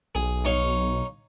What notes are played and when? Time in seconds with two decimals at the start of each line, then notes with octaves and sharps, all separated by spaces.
0.15 B1 G#4
0.45 D#4 C#5 F5